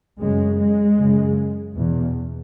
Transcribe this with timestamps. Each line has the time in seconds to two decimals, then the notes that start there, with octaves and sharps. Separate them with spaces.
0.20 F#2 C#3 G#3
0.58 G#3
0.98 F#2 C#3
1.75 E2 B2